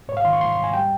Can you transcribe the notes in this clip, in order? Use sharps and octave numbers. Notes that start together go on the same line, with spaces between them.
G#2 C#5
F5
D#3 C6
C#6
G#2 C6
C6
G#2
G#5
G3 G5